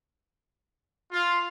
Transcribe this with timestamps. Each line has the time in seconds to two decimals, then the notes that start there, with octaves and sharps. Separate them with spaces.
1.12 F4